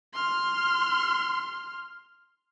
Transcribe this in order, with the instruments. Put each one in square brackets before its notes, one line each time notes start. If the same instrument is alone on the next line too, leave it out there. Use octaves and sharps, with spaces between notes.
[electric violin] C6 F6